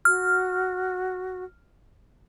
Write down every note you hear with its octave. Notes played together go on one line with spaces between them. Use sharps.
F#4 F6